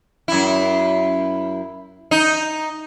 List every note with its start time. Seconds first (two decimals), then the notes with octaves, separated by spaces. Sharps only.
0.28 F#2 E4
2.11 D#4